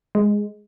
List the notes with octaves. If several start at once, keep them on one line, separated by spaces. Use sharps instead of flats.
G#3